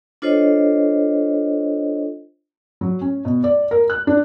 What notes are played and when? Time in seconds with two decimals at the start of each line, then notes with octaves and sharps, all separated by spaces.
0.22 D4 F4 A4 C5 C#5 D#5
2.81 F#3
3.01 C#4
3.25 B2
3.44 D5
3.71 A#4
3.90 F#6
4.07 D4